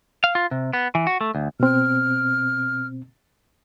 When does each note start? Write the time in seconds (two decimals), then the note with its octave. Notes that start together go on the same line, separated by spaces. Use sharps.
0.24 F5
0.35 F4
0.51 C3
0.73 B3
0.95 E3
1.07 F#4
1.21 A3
1.35 D2
1.60 B2 C4 F6